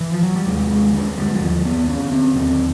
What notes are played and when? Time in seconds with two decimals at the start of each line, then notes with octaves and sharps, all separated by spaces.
0.01 E3
0.12 F3
0.23 F#3
0.36 G3
0.47 D#2 G#3
0.71 G#3
0.94 D3 G#3
1.17 G3
1.34 F#3
1.41 D#2 F3
1.65 B3
1.88 D3 C#4
2.12 C4
2.36 D#2 C4